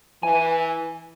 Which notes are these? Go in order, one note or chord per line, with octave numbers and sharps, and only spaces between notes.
E3 G#5